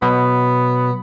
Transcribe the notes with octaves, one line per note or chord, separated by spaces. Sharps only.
B2 F#3 B3